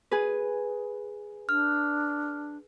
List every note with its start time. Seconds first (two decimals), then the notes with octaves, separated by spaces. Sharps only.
0.11 G#4 B4
1.49 D4 F6